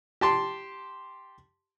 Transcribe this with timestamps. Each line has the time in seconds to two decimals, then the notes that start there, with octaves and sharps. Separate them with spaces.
0.21 G4 A5 C6